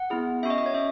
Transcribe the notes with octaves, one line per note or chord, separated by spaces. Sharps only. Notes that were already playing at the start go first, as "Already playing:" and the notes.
Already playing: F#5
B3 E4 G#4
C#4 F#4 D#5 E5
D#5
C#5
C#4 E5